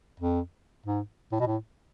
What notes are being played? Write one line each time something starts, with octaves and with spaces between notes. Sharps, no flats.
F2
G#2
A2
B2
A2